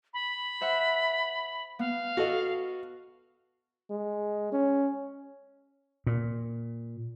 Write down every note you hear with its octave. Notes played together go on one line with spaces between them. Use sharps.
B5
C5 E5 F#5
B3 F5
F#4 A4 D#5
G#3
C#4
A#2